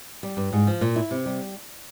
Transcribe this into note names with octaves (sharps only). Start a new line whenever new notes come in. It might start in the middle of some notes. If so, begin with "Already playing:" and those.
G3
G2
G#2
F3
A#2
E4
C3
G3